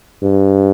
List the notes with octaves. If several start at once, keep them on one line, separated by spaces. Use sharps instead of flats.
G2